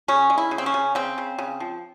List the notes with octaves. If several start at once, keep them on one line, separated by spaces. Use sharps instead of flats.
C#3 C#4
G#3
E4
C#3
C4
C#4
C#3
C#3 C4
C#3
C#3
F3